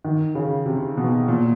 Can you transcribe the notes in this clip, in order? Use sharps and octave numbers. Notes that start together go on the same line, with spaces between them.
D#3
C#3
C3
B2
A#2